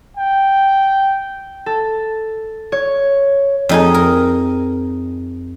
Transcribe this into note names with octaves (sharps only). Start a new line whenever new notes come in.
G5
A4
C#5
F2 D#4 G#4
A#4